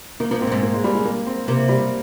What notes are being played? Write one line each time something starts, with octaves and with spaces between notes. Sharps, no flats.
D#3 A#3
F3 A#3
G#2 C4
A#2
G#2 C4
A#3
G#3
G3
G#3
A#3
C4
C3 A#3
G3